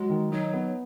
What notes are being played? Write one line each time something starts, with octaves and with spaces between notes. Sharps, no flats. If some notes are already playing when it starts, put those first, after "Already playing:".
Already playing: F#3 G#3
D#3
F#3 D#4
B3